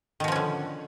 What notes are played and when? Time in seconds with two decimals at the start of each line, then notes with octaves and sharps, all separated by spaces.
0.20 D#3
0.24 B2
0.28 F3
0.32 C#4
0.36 D3